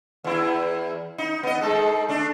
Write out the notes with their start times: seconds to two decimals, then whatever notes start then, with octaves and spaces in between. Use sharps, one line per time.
0.24 E2 E4
1.18 D#4
1.43 B3 D#5
1.61 G#3 D#4 A4
2.09 A3 D4